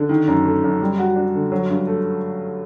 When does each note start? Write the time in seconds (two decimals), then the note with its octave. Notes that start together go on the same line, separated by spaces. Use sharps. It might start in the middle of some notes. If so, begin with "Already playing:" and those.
Already playing: D3
0.09 D#3
0.27 F#2
0.45 A3
0.64 F#2
0.81 G3
0.99 F#4
1.16 D4
1.34 D3
1.52 F#3
1.69 G2
1.87 A3